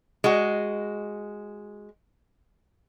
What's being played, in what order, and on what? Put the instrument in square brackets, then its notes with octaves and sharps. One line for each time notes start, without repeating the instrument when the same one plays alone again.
[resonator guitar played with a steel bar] G#3 F#4